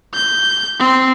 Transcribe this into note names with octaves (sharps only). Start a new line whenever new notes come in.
G6
C4